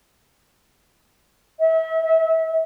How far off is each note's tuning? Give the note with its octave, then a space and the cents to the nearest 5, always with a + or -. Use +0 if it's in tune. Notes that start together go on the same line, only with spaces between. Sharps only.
E5 -35